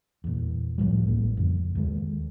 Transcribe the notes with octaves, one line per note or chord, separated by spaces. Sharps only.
E2 A#2
C#2 A2 F3 G3
A1 G#3 A#3
F2 C#3
D#2 D#3 G#3